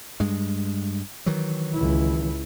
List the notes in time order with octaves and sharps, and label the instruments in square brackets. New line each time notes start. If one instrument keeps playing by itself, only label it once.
[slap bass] G2 G#3
D#3 E3 F#3
[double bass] C#2 E4